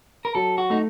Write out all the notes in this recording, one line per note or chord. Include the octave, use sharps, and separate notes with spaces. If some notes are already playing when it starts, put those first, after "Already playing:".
A#4
F#3 A4
F#4
A3 D#4